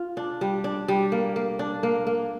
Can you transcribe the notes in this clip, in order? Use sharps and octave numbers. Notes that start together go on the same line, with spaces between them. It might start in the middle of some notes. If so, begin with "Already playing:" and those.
Already playing: F4
D4
G3
D4
G3
A#3
A#3
D4
A#3
A#3